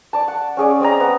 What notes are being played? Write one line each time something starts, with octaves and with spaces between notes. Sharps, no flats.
D5 A5
F#5
C#4 G#4 D5
C4 D5 D#5 A#5
B3